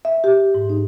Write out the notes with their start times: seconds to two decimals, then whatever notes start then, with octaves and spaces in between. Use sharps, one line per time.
0.05 E5
0.24 G4
0.55 G#2
0.70 D#4